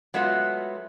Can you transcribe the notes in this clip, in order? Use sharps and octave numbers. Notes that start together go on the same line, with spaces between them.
F#3 G#3 A3 B3 F4